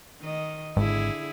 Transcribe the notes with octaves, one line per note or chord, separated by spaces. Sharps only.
D#3 D#5
G#1 D3 E4 G#4